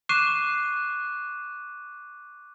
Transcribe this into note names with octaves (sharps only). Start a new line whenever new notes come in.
C#6 D6 F#6 C7 D#7 E7